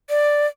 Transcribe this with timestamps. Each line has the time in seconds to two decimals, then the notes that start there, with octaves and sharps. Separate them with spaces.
0.10 D5